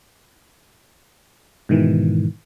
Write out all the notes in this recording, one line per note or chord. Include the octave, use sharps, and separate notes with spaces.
G#2 B2 D#3 E3